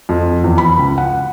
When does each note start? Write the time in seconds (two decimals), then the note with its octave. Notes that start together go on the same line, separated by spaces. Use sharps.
0.09 F2
0.44 E2
0.58 B5
0.77 C#2
0.98 F#5